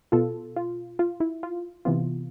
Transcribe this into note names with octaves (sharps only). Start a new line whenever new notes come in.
B2 B3 F4 A4
F4
F4
E4
F4
C3 E3 B3 F4